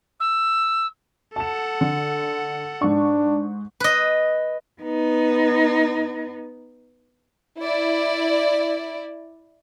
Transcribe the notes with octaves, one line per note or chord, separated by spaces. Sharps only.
E6
A4 F#5 A5 E7
D3
G#2 D4 C#6
B4 D#5
B3 D#4
E4 D5